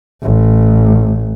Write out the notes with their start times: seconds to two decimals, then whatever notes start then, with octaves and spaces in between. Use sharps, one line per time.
0.23 A1